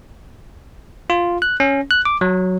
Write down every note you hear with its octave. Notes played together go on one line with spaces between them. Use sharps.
F4
F#6
C#4
F#6
D6
F#3